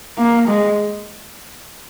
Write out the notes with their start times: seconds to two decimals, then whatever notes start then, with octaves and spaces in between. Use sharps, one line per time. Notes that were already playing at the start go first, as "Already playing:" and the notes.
0.18 A#3
0.48 G#3